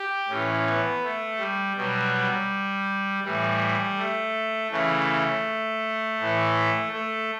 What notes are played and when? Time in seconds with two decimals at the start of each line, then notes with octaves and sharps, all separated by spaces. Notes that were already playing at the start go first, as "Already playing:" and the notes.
Already playing: G4
0.29 A2 E3 C#4
0.66 B3
1.03 A3
1.39 G3
1.76 B2 F#3 G3
2.14 G3
3.24 A2 E3 G3
3.98 A3
4.71 C#3 E3 A3
6.19 A2 E3
6.92 A3